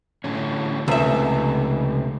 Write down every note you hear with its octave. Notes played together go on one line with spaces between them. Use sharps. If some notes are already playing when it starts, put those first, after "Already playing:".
A2 D3 C#4
C#2 C3 A3 E5